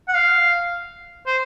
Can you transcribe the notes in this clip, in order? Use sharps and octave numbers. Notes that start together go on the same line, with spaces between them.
F#5
F5
C5